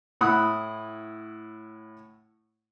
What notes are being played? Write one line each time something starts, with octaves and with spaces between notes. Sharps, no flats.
A2 E4 F#5 B5 D#6 F#6